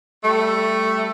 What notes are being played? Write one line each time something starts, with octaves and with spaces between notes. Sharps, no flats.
G3 A3